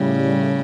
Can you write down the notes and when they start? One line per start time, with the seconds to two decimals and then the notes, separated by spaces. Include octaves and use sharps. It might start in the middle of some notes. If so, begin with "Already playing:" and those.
Already playing: A2 C#3 G3
0.20 A2